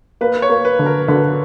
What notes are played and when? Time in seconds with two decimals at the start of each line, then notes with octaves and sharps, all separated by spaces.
0.21 A#3 B4
0.42 C#5
0.49 A#3
0.65 B4
0.79 D3
0.86 A#4
1.08 D3 B4